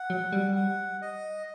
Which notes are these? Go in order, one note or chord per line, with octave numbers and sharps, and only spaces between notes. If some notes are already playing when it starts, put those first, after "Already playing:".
Already playing: F#5
F#3
G3
F#5
D#5